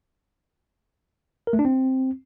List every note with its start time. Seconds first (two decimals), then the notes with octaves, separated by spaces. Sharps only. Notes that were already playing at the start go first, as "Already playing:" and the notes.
1.47 A#4
1.53 A3
1.59 D4
1.65 C4